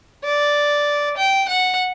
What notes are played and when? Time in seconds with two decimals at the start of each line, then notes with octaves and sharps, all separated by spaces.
0.24 D5
1.17 G5
1.49 F#5